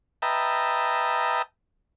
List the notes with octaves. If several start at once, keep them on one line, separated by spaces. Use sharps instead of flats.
B4 D#5 E5 G5 A5 A#5